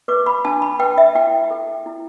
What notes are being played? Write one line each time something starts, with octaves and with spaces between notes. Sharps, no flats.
B4 D6
B5
D4 A5
B5
B4 G5
E5
E4 G5
A4
E4